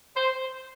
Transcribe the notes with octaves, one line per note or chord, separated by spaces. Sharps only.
C5